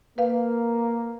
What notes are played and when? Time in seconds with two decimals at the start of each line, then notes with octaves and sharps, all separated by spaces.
0.18 A#3 B4 F5